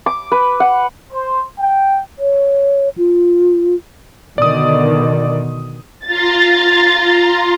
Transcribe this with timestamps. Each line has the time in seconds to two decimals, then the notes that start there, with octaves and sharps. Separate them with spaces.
0.06 D6
0.32 B4
0.60 F#5
1.11 C5
1.58 G5
2.19 C#5
2.98 F4
4.38 B2 D3 D#3 D5 D#6
6.05 F4 A#5 C6 A6